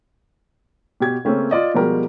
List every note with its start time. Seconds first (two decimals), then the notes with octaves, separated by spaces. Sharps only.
1.00 B2 G4 G#6
1.25 C#3 A3 A#3 C4 C#4
1.51 F4 D5 D#5
1.74 B2 F3 G3 G#3 G4 A#4